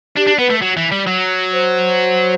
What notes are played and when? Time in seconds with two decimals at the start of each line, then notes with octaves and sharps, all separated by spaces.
0.17 D4 G4
0.27 D4
0.39 B3 B4
0.50 A3
0.62 F#3
0.77 E3
0.92 G3
1.07 F#3
1.53 C5